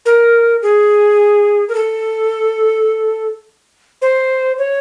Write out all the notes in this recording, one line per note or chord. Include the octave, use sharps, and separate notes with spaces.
A#4
G#4
A#4
A4
C5
C#5